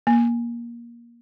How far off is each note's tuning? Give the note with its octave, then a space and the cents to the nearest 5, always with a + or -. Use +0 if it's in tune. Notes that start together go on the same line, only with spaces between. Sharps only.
A#3 +20